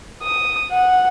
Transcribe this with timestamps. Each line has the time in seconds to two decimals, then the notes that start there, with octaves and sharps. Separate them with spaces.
0.23 D#6
0.72 F#5